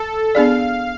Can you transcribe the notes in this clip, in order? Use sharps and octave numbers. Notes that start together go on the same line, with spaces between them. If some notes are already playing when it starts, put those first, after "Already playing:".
Already playing: A4
B3 D4 G#4 D5 F5